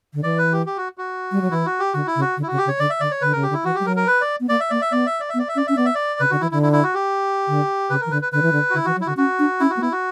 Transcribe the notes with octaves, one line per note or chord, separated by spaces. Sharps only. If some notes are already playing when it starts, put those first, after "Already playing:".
D3
E3 D5
B4
G4
G4
F#4
F#4
G3
F#3
E3 E4
F#4
G4
D3 F#4
E4
C#3
F#4
D3
E4
C#3 F#4
G4
C#3
C#5
D3 D5
E5
D3 D5
C#5
D3 B4
C#3 A#4
G4
D3
E4
E3 F#4
G3 G4
F#3 A#4
A#4
B4
D5
B3
A#3 D5
E5
A#3 D5
E5
B3 D5
E5
D5
E5
B3
D5
E5
C#4 D5
C#4 E5
B3 D5
E5
D5
C#3 B4
D3 F#4
E3 E4
D3 E4
E4
E4
F#4
G4
D3
C#3 B4
A#4
E3
D3 B4
B4
D3 B4
E3
D3
F#4
D3 E4
E3 F#4
F#3
E4
D3 F#4
C#4 F#4
D4
C#4 E4
F#4
A#3
B3 E4
F#4